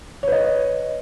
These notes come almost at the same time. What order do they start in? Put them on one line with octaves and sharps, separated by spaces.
C#5 B4 D#5